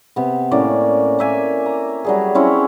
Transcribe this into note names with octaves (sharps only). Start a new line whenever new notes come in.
C3 B3
A2 A#3 C#4 D5
A#3 E5 G#5
A#5
F#3 G3 G#4
C4 C#4 E4 C#5